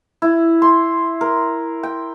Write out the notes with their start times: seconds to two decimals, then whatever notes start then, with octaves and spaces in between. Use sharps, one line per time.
0.22 E4
0.62 C6
1.21 A#4
1.83 G5